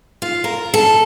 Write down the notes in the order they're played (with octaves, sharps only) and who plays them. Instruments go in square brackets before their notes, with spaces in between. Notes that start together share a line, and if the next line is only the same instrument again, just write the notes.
[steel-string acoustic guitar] F4
A#4
A4